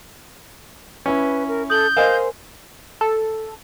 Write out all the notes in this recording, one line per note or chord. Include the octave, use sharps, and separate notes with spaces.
C#4 E4 B4
A#4
A4 D#6 G6 F#7
A#4 C5 D#5 F5 G#5
A4